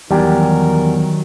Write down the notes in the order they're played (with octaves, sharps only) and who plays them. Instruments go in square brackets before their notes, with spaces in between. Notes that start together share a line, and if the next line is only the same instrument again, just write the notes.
[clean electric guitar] E2 [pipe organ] D#3 F#3 [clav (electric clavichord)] G3 G4 [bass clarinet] A#4